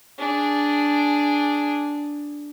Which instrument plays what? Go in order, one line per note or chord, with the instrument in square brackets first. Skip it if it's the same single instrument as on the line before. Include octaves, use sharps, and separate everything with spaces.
[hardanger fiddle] D4 G#4